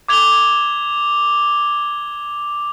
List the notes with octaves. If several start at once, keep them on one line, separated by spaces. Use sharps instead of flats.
D6 G#6 F7 G7